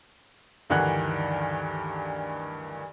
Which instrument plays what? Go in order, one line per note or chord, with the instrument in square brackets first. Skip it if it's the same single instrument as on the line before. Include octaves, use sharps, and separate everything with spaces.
[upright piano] D2 G2 D#3 E3 F#5 F#6